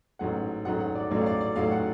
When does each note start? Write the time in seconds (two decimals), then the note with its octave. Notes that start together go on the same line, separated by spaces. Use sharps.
0.19 A1 G#2 F#3 A3 F#5
0.65 A1 G#2 F#3 A3 F#5
0.80 F#5
0.95 D5
1.11 A1 G#2 F#3 A3 D5
1.21 F5
1.26 D5
1.41 D5
1.56 A1 G#2 F#3 A3 F5
1.72 F#5